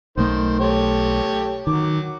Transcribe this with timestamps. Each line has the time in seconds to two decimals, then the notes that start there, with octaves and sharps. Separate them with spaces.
0.17 B1 D#3 A3 C5
0.60 G4 A4 C#5
1.67 D#3 F#3 D6